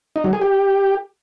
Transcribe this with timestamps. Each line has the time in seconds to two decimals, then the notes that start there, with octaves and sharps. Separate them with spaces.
0.16 D#4
0.24 F#3
0.33 G#4
0.41 G4